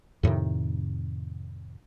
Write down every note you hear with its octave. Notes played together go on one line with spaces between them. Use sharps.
F2 A2 C3 D#3